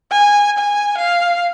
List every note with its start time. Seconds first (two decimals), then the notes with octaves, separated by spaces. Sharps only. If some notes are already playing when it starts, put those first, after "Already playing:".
0.12 G#5
0.58 G#5
0.98 F5